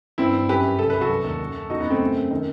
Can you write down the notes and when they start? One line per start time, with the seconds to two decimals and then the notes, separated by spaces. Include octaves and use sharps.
0.18 G2 C4 E4
0.34 G2
0.49 F#2 G4 B4
0.63 F#2
0.79 C2 A4
0.90 C2 B4
1.01 F#4 A4
1.09 F#3
1.24 D#2
1.41 F#2
1.55 F#2
1.70 E2 D#4 F#4
1.80 B3 D#4
1.86 C3 A3 C4
2.01 F#2
2.15 F#2
2.31 D#3